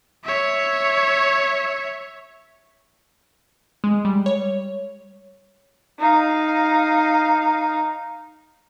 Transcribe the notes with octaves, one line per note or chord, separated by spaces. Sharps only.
C#5 E5
G#3
G3
C#5
D#4 F5